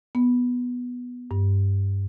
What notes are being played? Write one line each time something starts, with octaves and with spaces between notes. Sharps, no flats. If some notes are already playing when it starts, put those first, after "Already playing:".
B3
G2